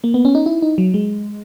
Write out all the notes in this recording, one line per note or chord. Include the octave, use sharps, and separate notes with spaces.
A#3
B3
C#4
D#4
E4
D#4
F#3
G#3